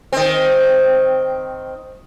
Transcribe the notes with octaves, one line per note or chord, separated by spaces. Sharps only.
D#3 C4